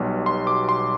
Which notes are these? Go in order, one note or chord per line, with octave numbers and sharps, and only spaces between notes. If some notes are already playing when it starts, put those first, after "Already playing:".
Already playing: B1 B2 G3
C6
D6
C6